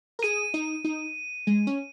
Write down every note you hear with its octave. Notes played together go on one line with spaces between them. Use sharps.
A#4
G#4 D#7
D#4
D#4
G#3
C#4